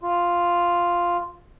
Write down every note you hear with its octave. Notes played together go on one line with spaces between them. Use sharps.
F4